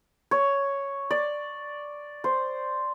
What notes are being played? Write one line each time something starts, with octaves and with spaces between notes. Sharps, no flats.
C#5
D5
C5